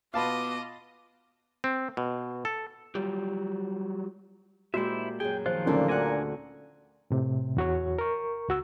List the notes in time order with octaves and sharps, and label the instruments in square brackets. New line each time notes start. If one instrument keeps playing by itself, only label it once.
[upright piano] B2 B3 [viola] F4 D#5 [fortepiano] F5 A5 B5 [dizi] D6
[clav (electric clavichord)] C4
B2
A4
[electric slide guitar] F#3 G3 F4 G4
[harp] A#2 G#3 G4 [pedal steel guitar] E4 C5 E5 [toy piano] F#4
[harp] F#2 A#2 G#4 [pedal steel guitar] G5
[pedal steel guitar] D#3 F3 F4 [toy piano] C5
[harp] D2 D3 F#3 [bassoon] A#2 [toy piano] C#4 D#4
[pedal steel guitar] D4 G#5 A#5 [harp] F4 F#4 F#5
[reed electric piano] A2 C3
E2 F#4 C#5
A#4 C#6
C#2 F#4 E6